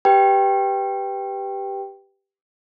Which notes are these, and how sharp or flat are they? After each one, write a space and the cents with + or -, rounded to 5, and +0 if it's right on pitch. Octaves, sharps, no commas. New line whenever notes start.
G4 +0 B4 +0 G5 +0